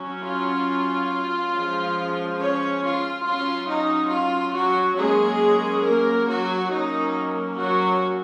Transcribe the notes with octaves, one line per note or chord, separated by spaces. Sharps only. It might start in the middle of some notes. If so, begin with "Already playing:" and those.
Already playing: F#3 C#4
F4
F3 G#3 C#4
C#4 C#5
F4
F#3 C#4 F4
D#4
F4
F#3 F#4
F#3 G#3 A#3 C#4 G#4
A#3 A#4
F#3 F#4
F#3 A#3 C#4 D#4
F#3 F#4